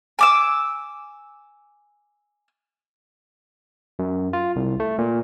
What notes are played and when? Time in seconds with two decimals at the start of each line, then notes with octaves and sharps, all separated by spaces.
0.19 G#5 D6 E6
3.99 F#2
4.33 F4
4.56 C2
4.80 A3
4.98 A#2